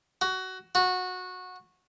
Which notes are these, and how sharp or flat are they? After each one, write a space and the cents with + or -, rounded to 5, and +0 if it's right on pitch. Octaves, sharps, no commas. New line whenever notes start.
F#4 +20
F#4 -15